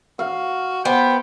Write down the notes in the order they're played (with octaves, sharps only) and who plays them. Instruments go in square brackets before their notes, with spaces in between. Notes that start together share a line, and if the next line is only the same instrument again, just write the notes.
[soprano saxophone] F#4 [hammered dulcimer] F5
[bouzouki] B3 [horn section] G4 G5 [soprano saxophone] C5